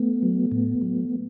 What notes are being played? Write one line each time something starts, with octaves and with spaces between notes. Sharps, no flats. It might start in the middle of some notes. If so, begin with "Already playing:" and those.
Already playing: A3 B3
F#3
A2
F#3